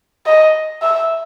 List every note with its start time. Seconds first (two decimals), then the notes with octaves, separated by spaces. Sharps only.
0.26 D#5
0.82 E5